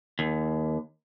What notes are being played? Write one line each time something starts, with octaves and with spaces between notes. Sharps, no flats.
D#2